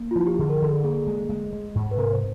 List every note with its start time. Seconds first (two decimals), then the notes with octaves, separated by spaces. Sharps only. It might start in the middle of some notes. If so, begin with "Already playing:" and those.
Already playing: A#3
0.11 F4
0.16 F3 E4
0.27 G4
0.38 D3 G#4
0.49 A#4
0.62 D3 A4
0.68 G#4
0.76 A4
0.83 A#3 G#4
1.07 G#3
1.29 G#3
1.53 G#3
1.75 G#2
1.91 B4
1.97 C3 A#4
2.13 C5